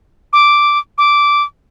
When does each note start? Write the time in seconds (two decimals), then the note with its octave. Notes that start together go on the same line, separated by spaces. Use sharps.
0.33 D6
0.98 D6